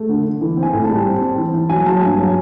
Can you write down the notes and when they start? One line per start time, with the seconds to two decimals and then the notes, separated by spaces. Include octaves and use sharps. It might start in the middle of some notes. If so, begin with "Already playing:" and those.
Already playing: A3
0.09 D3
0.26 D3
0.41 E3
0.57 C4
0.63 G#5
0.73 A2
0.84 A5
0.89 G3
1.06 C4
1.21 C4
1.38 E3
1.54 E3
1.70 F#3 G#5
1.86 F#3 A5
2.02 G2 G#5
2.18 F#3